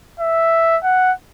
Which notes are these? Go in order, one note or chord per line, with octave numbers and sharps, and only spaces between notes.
E5
F#5